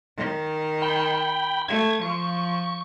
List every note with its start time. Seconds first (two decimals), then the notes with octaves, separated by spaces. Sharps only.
0.17 D#3
0.82 G5 B5
1.68 A3 G#6
2.02 F3 C#6